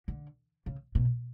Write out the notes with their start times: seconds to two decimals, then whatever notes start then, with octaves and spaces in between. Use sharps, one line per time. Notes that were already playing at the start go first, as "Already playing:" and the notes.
0.08 D3
0.66 C#3
0.95 B2